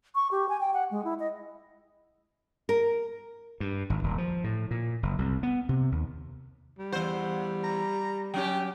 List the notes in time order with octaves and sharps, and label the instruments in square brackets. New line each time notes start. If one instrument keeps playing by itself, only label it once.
[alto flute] C#6
G4
G#5
G5
F#5
G#3
E4
D#5
[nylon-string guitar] A#4
[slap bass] G2
G#1
D#1
F3
A2
A#2
F#1
C2
B3
C3
D#2
[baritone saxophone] G3
[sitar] E2 C5 [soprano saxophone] F#5
[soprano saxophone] A#5
[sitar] F#3 C#4 G4 [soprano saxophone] G5